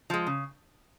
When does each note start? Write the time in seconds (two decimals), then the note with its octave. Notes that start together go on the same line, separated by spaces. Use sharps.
0.10 F3 G#3
0.27 C#3